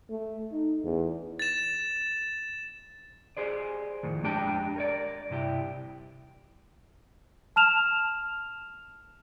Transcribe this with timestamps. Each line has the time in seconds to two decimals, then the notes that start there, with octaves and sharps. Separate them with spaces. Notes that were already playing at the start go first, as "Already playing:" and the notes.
0.10 A3
0.52 D#4
0.84 E2
1.39 A6 E7
3.37 G4 G#4 C5 D5
4.03 F2 A2 D#3
4.23 F2 G#3 D4 G4 G5 A5
4.76 A#4 C#5 D5
5.30 G2 C3 E4 G4
7.56 A5 F6 E7 F7